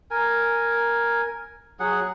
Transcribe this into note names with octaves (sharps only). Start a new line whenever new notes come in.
A#4 G#5
F#3 G#4 F#5